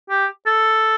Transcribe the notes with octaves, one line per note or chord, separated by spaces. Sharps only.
G4
A4